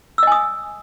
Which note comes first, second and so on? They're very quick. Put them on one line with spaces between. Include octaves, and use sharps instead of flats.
E6 D#5 G#5 D#6